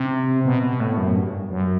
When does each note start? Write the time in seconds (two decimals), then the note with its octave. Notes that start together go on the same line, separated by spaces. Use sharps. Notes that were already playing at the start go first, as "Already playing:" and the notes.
Already playing: C3
0.45 B2
0.63 B2
0.80 A2
0.97 F#2
1.15 G2
1.50 F#2